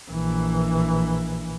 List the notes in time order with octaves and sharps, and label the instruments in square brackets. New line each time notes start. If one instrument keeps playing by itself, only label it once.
[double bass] A#1 E3